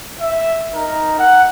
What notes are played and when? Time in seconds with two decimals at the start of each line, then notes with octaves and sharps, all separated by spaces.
0.21 E5
0.75 D#4 A#4
1.20 F#5